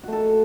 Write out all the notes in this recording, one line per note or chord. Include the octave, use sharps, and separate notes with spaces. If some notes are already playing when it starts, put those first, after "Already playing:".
A3 F#4 A4